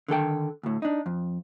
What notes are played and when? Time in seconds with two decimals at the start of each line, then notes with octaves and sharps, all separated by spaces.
0.08 D3 D#3 A4 G5
0.63 D2 A2
0.82 D4 D#4
1.06 F2